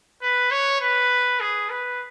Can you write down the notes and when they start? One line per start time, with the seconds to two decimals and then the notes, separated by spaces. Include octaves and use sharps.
0.22 B4
0.51 C#5
0.81 B4
1.40 G#4
1.70 B4